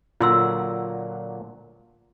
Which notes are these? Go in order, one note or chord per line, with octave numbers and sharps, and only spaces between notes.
A#2 D3 F#3 F4 C6 E6